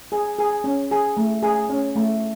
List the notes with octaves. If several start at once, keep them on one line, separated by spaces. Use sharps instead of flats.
G#4
G#4
C#4
G#4
A3
G#4
C#4
A3